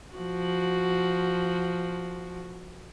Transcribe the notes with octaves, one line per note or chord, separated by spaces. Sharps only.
F3 F#4